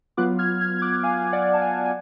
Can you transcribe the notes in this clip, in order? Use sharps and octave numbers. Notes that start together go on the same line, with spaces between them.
F#3 B3 F4 D6 F#6
F6 G#6
F6 G#6
G#6
D6 F#6
F5 G#5
D5 F#5
A5
F5 G#5
G#5